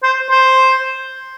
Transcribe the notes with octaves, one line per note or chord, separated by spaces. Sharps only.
C5
C5